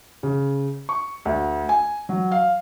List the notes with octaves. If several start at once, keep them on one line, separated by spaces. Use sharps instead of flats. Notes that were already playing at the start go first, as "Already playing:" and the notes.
C#3
C#6
D2
G#5
F#3
F5